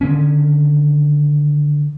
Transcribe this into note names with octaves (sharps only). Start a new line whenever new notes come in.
D3 D#3 C#4